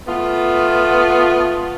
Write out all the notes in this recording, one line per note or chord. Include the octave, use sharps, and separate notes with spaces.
A3 B3 F4